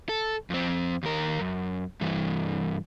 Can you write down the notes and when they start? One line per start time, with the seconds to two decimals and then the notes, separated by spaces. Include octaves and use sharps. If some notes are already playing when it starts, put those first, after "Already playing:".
0.09 A4
0.50 F2 C4
1.03 D#2 A#4
1.41 F#2
2.01 G2 E3